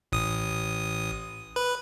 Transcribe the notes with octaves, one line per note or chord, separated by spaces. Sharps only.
A1 D#6
B4